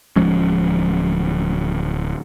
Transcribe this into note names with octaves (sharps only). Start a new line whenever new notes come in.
D1 F3 G#3 C#4